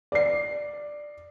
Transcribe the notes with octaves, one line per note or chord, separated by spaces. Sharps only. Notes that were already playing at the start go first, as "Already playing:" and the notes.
D5 C7